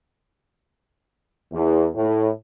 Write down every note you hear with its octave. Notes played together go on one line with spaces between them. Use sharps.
E2
A2